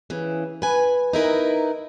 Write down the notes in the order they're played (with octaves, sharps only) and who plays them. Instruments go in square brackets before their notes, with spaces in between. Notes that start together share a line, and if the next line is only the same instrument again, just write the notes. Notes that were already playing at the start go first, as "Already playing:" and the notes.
[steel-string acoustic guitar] C#3 E3
B4 G#5
D#4 E4 A#4 B4